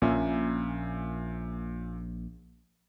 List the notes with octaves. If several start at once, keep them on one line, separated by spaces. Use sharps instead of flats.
A#1 A#2 C#4 E5